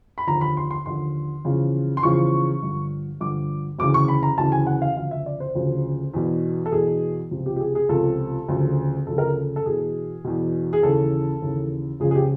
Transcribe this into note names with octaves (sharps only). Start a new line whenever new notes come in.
B5
D#2 D3 F3 A#5
B5
C6
C6
D#2 D3 F3 C6
E2 C#3 F3
C6
E2 C#3 F3 C#6
G2 D3 F3
G2 D3 F3 D6
D2 C#3 E3 D6
C#6
B5
A#5
D2 C#3 E3 A5
G#5
F#5
F5
D2 C#3 F3 F5
E5
D5
C5
D2 C#3 F3
E2 B2
A4
E2 B2 G#4
C#2 C3 F3
G4
G4
G#4
G#4
C#2 C3 F3 A4
D2 C#3 F3
D2 C#3 F3 A4
A#4
A4
A4
E2 B2 G#4
E2 B2
G#4
D#2 C#3 E3 A4
D#2 C#3 E3
C#2 C#3 F3 G#4
G#4
G4